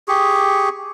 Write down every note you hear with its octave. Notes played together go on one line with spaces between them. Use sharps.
G4 G#4 C#6